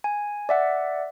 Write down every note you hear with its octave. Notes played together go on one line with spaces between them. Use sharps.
G#5
D5 E5 F#5